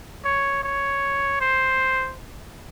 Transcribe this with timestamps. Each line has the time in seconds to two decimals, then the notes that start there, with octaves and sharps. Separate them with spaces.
0.25 C#5
0.63 C#5
1.41 C5